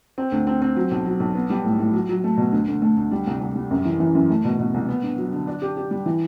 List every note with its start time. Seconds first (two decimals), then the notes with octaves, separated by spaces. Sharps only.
0.18 C4
0.32 D2
0.47 C4
0.62 C4
0.76 F#3
0.91 B1
1.06 F#3
1.20 B1
1.35 B3
1.50 G3
1.64 A2
1.79 A2
1.93 F#3
2.09 F#3
2.24 A3
2.38 B2
2.52 D2
2.68 D2
2.82 A3
2.97 D2
3.11 G3
3.27 C2
3.41 C2
3.55 G3
3.71 F#2
3.85 E3
4.00 E3
4.15 F#2
4.30 A3
4.44 B2
4.59 B2
4.74 C2
4.89 B3
5.03 G2
5.18 F#3
5.33 D3
5.47 D4
5.62 G4
5.77 G4
5.91 G3
6.06 E3